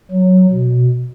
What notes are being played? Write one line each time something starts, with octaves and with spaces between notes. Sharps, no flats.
F#3
B2